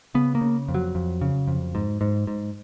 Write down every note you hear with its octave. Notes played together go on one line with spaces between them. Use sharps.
C#3 B3
A#3
C#3
F2
F#3
F2
C#3
F2
G#2
G#2
G#2